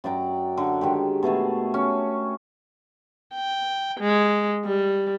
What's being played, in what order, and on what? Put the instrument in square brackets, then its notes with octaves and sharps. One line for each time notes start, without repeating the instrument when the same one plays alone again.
[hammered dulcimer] F#2 D5 G5 A#5
D3
D#3 G#3 G4
B2 A3 G#4 A4
C#4
[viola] G5
G#3
G3